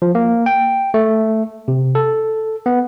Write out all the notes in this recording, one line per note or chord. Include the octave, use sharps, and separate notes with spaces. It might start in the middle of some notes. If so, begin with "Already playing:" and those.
F3
A#3
G5
A3
C3
A4
B3